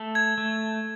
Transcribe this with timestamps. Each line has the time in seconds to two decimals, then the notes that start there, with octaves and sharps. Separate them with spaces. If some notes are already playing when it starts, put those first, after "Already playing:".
Already playing: A3 A4
0.15 G#6
0.38 A3